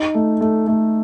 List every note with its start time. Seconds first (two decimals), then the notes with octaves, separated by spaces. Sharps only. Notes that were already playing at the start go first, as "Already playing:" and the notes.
Already playing: D#4
0.14 A3
0.41 A3
0.67 A3